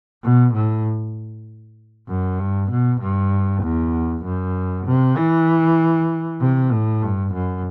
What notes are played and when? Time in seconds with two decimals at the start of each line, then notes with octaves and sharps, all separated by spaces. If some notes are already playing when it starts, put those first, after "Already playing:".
0.24 B2
0.54 A2
2.08 F#2
2.39 G2
2.71 B2
3.01 G2
3.63 E2
4.24 F#2
4.86 C3
5.17 E3
6.41 C3
6.72 A2
7.02 G2
7.33 F#2